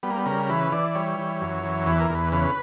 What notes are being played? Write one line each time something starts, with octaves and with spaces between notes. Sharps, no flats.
G3 B3
A#3
B3
C#3 A#4
E3 B4
E3 D5
G3 C#5
E3
F#2
E3
E2 B4
A#4
E2 B4
C#3 B4